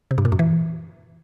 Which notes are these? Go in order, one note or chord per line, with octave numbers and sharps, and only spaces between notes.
C3
G2
A#2
F#2
E3